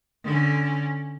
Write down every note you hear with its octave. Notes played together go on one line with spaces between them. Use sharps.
D3 C#4